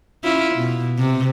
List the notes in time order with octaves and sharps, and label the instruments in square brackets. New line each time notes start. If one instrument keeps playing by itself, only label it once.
[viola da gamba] C#4 E4 F4
B2
C3